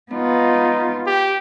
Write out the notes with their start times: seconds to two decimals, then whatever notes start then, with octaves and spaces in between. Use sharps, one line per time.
0.13 B3 D#4 F4
1.07 G4